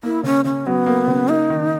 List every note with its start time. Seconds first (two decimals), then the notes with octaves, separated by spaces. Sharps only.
0.03 A#3 E4
0.23 C#3 C#4
0.44 C#3 C#4
0.67 F#3 B3
0.86 A#3
1.07 C#3
1.29 A#3 D#4
1.50 D#3